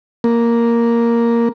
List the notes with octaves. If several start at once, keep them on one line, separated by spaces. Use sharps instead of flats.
A#3